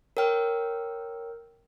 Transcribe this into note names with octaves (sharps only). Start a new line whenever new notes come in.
A#4 C#5 G5 F6